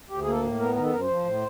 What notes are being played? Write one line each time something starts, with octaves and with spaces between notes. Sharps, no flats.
D2 G4
G#4
A#3 A4
A2
B3 A#4
D#3 A#4
A4
F#2 A#4
C5
F3
A2